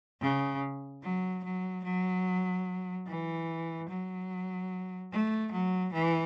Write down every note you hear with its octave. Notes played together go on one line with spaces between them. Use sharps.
C#3
F#3
F#3
F#3
E3
F#3
A3
F#3
E3